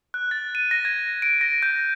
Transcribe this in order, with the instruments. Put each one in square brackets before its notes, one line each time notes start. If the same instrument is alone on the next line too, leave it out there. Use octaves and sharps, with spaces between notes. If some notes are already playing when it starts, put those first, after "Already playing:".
[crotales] F#6
A6
D#7
A#6
G#6
D7
A#6
G6